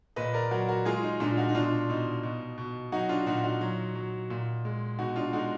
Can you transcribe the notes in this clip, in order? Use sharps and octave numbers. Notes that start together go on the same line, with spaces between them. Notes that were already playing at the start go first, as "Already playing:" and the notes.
A#2 B4 D#5
A#4 D5
F#3 F#4 A#4
F#4 A#4
G#3 F4 G#4
D#4
A#2 D4 F4
D#4 F#4
D#4
B2 D4 F4
B2 D#4
B2
B2
F#3 D#4 F#4
D4 F4
A#2 D#4 F#4
D#4 F#4
F#3
F#3
A#2
G#3
B2 D#4 F#4
D4 F4
G#3 D#4 F#4